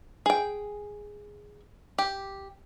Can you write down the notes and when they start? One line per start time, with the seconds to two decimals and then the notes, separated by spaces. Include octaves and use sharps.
0.26 G#4 G5
1.98 G4